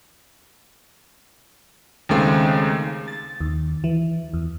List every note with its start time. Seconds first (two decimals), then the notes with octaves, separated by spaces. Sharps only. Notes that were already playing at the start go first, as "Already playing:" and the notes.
2.09 D#2 C#3 G#3 A3 C4 D#4
3.08 A6
3.41 D#2
3.84 E3
4.34 E2